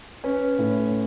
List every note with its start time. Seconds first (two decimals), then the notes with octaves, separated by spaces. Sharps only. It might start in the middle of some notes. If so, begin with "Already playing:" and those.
0.24 C#4 B4
0.58 A2